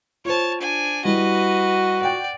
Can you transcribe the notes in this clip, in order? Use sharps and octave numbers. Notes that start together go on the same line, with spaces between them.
F4 C5 C#5 A5
D4 G#5
G3 E4 F#4 B4 D#5
D5 F#5 G5